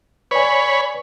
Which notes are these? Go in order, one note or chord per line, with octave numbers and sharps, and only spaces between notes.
B4 C#5 D5 G#5 B5